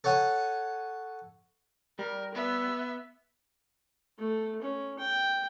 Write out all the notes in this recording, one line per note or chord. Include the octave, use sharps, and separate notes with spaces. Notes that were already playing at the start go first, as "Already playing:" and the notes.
A4 C#5 F#5 G#5
G3 A#4
B3 E5
A3
C#4
G5